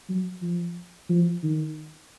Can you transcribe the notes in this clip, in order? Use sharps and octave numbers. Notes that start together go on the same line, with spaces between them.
F#3
F3
F3
D#3